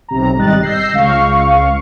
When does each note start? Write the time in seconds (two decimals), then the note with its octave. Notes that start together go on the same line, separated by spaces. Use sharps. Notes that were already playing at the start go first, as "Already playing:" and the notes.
0.08 B1 C3 A#5
0.37 G#1 G3 D#5 F#6 A6
0.63 E6 G6 A#6 C7
0.93 C#2 F5 C#6